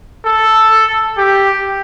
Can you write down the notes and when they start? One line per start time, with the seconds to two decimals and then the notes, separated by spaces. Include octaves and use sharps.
0.24 A4
1.17 G4